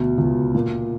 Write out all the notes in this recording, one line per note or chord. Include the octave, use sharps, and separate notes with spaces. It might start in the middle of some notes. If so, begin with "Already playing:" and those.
Already playing: D2 B2
C#2
A#2